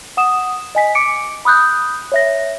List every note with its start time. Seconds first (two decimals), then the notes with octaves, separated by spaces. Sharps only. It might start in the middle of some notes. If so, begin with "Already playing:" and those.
0.17 F#5 D#6 E7
0.75 D#5 G#5 B6
0.95 D6 C#7 D7
1.45 B5 D#6 F#6 G6
2.12 C#5 E5 A#6